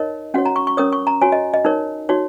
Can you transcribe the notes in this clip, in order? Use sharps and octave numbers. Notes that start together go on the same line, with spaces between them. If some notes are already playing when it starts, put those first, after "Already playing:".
Already playing: D#4 A#4 C#5 D#5
C#4 F#4 C#5 F#5
A#5
C#6
C#6
C#4 A#4 C#5 D#6
C#6
A#5
F#4 C#5 G#5
D#5
D#5
D#4 A#4 C#5
D#4 F#4 C#5